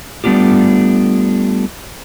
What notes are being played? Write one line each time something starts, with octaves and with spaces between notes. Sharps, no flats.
G3 A3 B3 D4 F4 G4